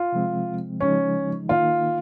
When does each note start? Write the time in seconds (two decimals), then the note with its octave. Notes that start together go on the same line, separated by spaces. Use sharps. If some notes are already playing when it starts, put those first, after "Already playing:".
Already playing: F4
0.12 C3 F3 G#3 C4
0.80 C#3 F3 G#3 C#4 D#4
1.48 D#3 A#3 D#4 F4